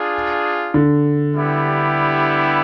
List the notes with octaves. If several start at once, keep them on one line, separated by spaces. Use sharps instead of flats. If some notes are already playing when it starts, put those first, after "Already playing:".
Already playing: D4 F4 G#4
D3
G3 B3 E4 G4